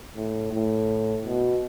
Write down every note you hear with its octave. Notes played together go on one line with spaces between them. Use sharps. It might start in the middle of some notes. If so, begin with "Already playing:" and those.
A2
A2
B2